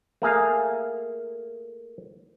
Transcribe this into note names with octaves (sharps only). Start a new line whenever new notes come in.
A3 A#3 G#4 F5